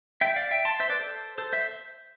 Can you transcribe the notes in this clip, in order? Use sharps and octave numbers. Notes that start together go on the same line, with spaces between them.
E5 G5
D5 F5
E5 G5
A5 C6
C5 E5
B4 D5
A4 C5
A4 C5
C5 E5